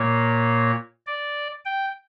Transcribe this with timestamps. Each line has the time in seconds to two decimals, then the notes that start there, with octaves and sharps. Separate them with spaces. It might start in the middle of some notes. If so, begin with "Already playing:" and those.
Already playing: A#2 A#3 C#5
1.07 D5
1.65 G5